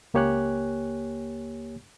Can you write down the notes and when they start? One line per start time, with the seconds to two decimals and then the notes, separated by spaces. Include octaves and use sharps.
0.14 C#2 A#3 G4 C#5 G#5 F#6